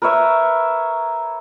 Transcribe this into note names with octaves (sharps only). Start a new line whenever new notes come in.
A#4 B4 C#5 E5